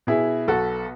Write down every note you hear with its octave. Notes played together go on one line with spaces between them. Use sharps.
B2 E4 G#4
B1 F#4 A4